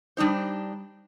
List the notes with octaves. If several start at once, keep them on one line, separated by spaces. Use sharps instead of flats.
G3 D4 D#4 C5